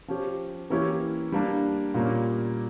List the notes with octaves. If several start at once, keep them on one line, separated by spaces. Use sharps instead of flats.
F3 C#4 G4
E3 A#3 C#4 E4 G4
G3 A#3 D4
A#2 G3 A#3 C#4